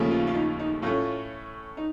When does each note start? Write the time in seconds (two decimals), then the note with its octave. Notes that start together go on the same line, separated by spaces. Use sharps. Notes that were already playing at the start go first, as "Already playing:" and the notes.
Already playing: D#2 C#3 F3 A3 C#4
0.11 F4
0.27 F4
0.35 D#4
0.59 D#4
0.82 A2 A3 C#4 F4
1.77 D#4